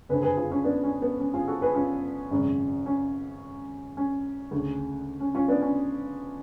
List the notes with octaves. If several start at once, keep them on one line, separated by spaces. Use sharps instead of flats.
F#1 F2 D3 G#4 B4
G#4 B4
F4 G#4
C#4 F4
B3 D4
C#4
B3
C#4
F4 G#4
F#4 A4
G#4 B4
C#4 F4
G#1 F#2 C#3
C#4
C#4
D2 C#3
C#4
C#4 F4
B3 D4
C#4